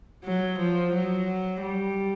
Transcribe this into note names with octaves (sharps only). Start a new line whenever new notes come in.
F#3
F3
F#3
G3